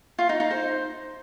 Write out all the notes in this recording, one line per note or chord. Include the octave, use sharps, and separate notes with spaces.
F4
D#4
D#4
C5